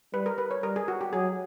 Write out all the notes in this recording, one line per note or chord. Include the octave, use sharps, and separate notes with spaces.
G3 B4
A#4
B4
C#5
G3 A#4
G#4
F#4
G4
F#3 G#4